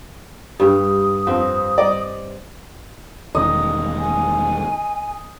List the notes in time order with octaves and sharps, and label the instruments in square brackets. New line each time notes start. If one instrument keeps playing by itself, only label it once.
[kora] G2 [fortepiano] G3 [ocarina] D#6
[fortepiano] F2 [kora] C4
[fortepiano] D5 D#5
[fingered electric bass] E1 D#3 [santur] D#5
[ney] G#5